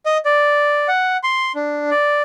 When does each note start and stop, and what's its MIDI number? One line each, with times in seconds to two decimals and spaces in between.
0.06 0.17 75
0.25 0.87 74
0.88 1.17 78
1.23 1.52 84
1.55 1.90 62
1.91 2.22 74